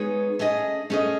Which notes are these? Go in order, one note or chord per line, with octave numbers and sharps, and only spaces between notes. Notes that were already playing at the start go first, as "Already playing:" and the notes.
Already playing: G#3 B3 D#4 G#4 C#5
A3 C#4 G#4 D#5
A3 C#4 G#4 D#5